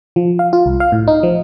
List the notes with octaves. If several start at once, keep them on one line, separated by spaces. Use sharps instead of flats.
F3
F5
F4
C2
F5
A2
D#4
F3